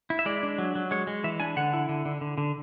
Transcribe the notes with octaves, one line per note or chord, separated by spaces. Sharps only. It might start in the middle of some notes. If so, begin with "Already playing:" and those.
E4
E5
G#3 D5
D4
F#3
F#3
G#3 C#5
G#3
E3 E5
D4 G#5
D3 F#5
E4
D3
D3
D3
D3